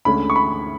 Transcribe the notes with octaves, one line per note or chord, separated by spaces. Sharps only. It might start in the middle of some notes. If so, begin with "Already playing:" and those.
D2 D3 G#3 C#4 B5
C#6
B5